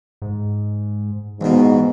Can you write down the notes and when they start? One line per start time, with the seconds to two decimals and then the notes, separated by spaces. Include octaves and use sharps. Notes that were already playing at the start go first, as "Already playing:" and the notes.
0.22 G#2
1.41 A#1 G#2 B2 E3